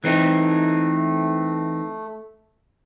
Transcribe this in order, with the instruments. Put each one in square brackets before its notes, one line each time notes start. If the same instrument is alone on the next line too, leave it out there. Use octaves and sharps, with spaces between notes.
[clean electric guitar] E3 C4 D#4 [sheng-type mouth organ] A3